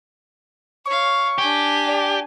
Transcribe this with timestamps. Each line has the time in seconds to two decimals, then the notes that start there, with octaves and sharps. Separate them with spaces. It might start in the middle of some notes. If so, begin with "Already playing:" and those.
0.86 C#5 F5 C#6
1.38 D4 G4 G#5
1.88 D5